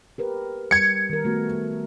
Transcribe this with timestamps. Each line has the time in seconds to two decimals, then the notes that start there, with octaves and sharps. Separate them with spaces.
0.18 G4 A#4 B4
0.71 G3 G#6 C#7
1.10 D#3 A#4
1.25 A3 B3 F#4